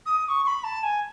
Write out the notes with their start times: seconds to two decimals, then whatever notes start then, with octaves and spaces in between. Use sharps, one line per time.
0.06 D#6
0.25 D#6
0.29 C#6
0.44 C#6
0.47 B5
0.64 A5
0.83 G#5